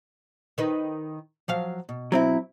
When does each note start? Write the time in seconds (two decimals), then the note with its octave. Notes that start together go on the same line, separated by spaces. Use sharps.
0.58 D#3 D#4 B4
1.48 F3 F#3 F5
1.89 B2
2.12 F#3 C4 E4